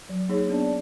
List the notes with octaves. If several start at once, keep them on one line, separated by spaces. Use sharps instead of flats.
F#3
A#3 D#4 G#4 C#5
B3 D4